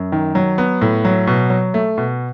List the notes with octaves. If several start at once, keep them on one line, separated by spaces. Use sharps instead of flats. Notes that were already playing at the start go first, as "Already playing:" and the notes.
Already playing: F#2
D#3
F#3
B3
A2
F#3
B2
F#3
A3
B2